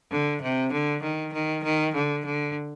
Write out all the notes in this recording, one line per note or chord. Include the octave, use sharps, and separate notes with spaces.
D3
C3
D3
D#3
D#3
D#3
D3
D3